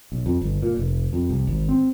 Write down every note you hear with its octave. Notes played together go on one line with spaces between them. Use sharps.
B1
F2
G1
A#2
F1
F2
C2
G#1
C4